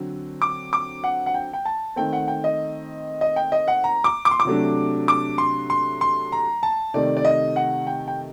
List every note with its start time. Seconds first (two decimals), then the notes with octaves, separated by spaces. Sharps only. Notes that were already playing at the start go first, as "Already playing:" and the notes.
Already playing: D3 F#3 C4
0.42 D6
0.73 D6
1.04 F#5
1.26 F#5
1.34 G5
1.53 G5
1.65 A5
1.96 D#3 A3 C4 G5
2.13 F#5
2.28 G5
2.44 D#5
3.21 D#5
3.36 G5
3.52 D#5
3.68 F#5
3.84 A#5
4.04 D6
4.25 D6
4.31 C6
4.40 D6
4.45 C3 F#3 A3 D4
5.08 D6
5.38 C6
5.70 C6
6.01 C6
6.32 A#5
6.63 A5
6.94 C3 D#3 A3 D5
7.17 D5
7.25 D#5
7.56 F#5
7.87 G5
8.08 G5